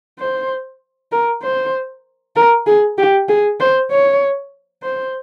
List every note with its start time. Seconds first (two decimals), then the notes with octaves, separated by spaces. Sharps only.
0.19 C5
1.12 A#4
1.42 C5
2.36 A#4
2.66 G#4
2.98 G4
3.28 G#4
3.60 C5
3.91 C#5
4.83 C5